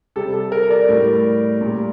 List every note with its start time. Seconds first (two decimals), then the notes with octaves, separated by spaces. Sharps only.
0.16 C3 G3 A4
0.34 A4
0.52 A#4
0.70 A#4 D5
0.89 A2 G3
1.61 A#2 G3